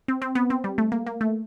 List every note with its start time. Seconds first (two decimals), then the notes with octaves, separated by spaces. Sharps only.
0.08 C4
0.22 C4
0.35 B3
0.50 C4
0.64 G3
0.78 A3
0.92 A#3
1.07 A#3
1.21 A3